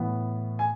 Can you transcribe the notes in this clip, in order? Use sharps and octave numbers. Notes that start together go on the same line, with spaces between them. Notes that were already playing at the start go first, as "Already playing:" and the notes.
Already playing: A2 E3 B3
G#5